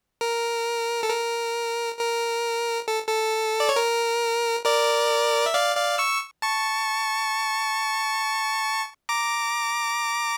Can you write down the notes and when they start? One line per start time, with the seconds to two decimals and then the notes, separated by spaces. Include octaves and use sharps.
0.21 A#4
1.03 A4
1.10 A#4
1.99 A#4
2.88 A4
3.08 A4
3.60 D5
3.69 C#5
3.76 A#4
4.65 A#4 D5
5.46 E5
5.54 D5 F5
5.76 D5 F5
5.98 C#6 E6
6.42 A5 C#6
9.09 A#5 D6